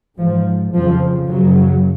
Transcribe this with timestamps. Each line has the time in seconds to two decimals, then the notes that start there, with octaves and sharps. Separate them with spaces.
0.18 G#2 F3
0.73 F2 C#3 F3
1.28 F#2 C#3 F#3